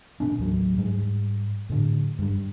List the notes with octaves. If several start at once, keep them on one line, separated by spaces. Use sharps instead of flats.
A#2 C4 D4
A1 D#2 F#3
G#2 G3
A2 D3
G2 G3